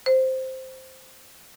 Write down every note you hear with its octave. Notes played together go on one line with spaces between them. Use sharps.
C5